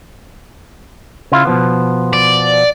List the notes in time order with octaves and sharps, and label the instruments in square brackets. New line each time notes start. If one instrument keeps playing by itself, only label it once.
[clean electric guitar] C#3 E4 F4
B2 F3 B3
[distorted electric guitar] D5